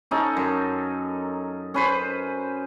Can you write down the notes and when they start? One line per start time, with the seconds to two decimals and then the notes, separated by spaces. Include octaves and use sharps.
0.11 C#4 D#4 A4
0.37 F#2
1.74 C#4 B4 C5